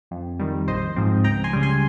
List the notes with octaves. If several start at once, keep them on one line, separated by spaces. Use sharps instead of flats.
F2
D#3 G3
A#1 C5 D#5
G#2 F3 C4
C#2 G5 A#5
G#5 C6
C#3 G3
G#5 C6